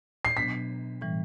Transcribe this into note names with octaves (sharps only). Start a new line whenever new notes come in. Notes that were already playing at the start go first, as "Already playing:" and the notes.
C7
B2 F#3 B3 D4 B6
A2 E3 G3